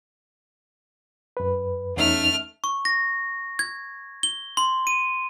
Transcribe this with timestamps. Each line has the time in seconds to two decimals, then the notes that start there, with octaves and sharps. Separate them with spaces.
1.37 F#2 B4
1.97 E2 A3 C#4 D#4 F6
2.64 C#6
2.85 A#6
3.59 G#6
4.23 G7
4.57 C6
4.87 D#7